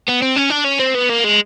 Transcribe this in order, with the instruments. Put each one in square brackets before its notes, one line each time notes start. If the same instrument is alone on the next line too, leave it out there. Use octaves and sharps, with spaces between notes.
[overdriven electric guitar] B3
C4
C#4
D4
C#4
C4
B3
A#3
G#3